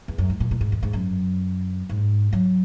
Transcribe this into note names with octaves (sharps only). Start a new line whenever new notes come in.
E2
F#2
G#2
A#2
A#2
G#2
E2
G#2
F#2
G#2
F#3